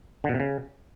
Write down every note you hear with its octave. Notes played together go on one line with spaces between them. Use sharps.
D3
B2
C3
C#3